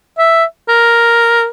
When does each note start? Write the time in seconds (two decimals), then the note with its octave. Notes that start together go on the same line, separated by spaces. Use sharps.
0.18 E5
0.69 A#4